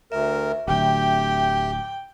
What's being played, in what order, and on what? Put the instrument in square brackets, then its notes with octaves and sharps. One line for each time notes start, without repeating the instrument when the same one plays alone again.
[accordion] D2 A#4 [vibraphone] E5
[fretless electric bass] D1 D2 [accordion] G4 [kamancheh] G5